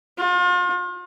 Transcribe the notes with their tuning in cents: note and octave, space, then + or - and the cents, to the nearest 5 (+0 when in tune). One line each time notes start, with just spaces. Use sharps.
F4 +40